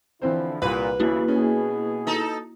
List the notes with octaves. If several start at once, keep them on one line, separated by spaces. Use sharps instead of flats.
D3 E3 F3 C4 E4 C5
C2 A#2 B4
G1 C#3 E3 A#3 E4 F#4
B2 C#4 G#4
D#4 A4